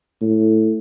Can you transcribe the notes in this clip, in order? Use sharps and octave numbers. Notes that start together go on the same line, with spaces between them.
A2